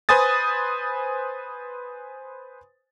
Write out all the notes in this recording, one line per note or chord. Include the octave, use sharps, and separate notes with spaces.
B4 C5 G#5 D#6 A6